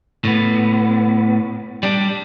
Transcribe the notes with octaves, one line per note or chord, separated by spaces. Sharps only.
A2 B3
G3 D4